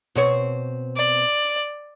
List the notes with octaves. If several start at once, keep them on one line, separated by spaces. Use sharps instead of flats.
B2 C4 C#5
D5